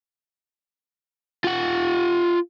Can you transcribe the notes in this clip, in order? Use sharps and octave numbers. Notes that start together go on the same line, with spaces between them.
F4 F#5